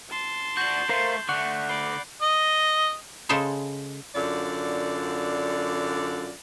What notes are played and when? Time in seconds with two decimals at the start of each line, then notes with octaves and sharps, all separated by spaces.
0.10 A5 C6
0.57 D4 F#4 G6 F#7
0.89 A3 A#4 C5 F5
1.29 D3 A3 F#5 C#6 F#6
1.69 D5 B5 C7 G7
2.22 D#5
3.29 C#3 G#3 A4 C5 C#5
4.15 F#2 D3 F4 D5